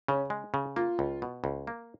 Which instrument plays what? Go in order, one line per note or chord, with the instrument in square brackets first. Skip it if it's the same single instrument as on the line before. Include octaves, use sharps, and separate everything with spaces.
[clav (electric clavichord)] C#3 [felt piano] C#4
[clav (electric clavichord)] G#3
C#3
[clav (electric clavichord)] A#3 [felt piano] F4
[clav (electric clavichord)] C#2
B2
C#2
A#3